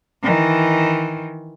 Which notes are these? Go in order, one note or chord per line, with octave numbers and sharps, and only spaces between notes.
D#3 E3